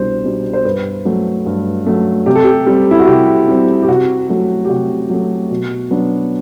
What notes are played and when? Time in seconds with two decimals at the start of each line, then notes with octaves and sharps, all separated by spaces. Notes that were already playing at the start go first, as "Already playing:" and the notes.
Already playing: C2 B2 G3 D4 C5
0.24 B2 G3 D4
0.53 C5
0.65 G2 B4
1.05 F#3 A3
1.46 G2
1.86 F#3 A3
2.26 C3 G4
2.35 A4
2.44 G4
2.66 G3 C4
2.91 E4
2.99 F#4
3.07 C3 G4
3.48 G3 C4
3.82 G4
3.88 C3 F#4
4.29 F#3 A3
4.65 G4
4.69 C3 F#4
5.10 F#3 A3
5.51 B2
5.91 F#3 B3 D4